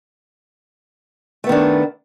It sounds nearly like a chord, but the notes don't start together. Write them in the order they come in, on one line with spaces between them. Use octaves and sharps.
A3 B3 D#3 D4